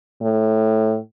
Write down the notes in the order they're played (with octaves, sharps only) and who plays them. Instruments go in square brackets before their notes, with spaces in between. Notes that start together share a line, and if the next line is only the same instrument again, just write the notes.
[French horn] A2